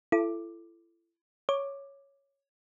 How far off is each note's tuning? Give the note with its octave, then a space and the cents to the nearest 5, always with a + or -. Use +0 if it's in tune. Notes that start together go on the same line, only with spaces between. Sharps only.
E4 +35 A4 +0 D6 +5
C#5 +0 D6 +10